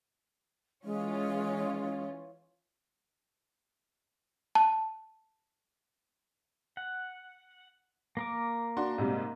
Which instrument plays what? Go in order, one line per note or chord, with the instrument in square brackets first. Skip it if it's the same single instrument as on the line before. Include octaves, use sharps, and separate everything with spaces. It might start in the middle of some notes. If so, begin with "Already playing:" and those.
[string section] E3 C#4 F4 [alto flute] G#3
[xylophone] A5
[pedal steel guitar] F#5
A#3 A#4 D6
[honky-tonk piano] D4 F#4 C6
G#2 C3 G3